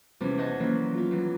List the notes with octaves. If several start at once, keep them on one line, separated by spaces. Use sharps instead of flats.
E2 C3 G3 B3 C#4
C5 C#5 D#5 F#5 A5
D#3 E3 F#3 A#3 C#4
B3 F4
D#3 E3 F#3 G3